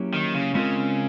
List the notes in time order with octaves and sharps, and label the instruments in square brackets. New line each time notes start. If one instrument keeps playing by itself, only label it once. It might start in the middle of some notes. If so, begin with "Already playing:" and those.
Already playing: [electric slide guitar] F#3 A#3 C#4 E4 G4
[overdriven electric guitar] D#3
C#3
[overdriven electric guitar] C#3 [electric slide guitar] G#3 C4 F4 A#4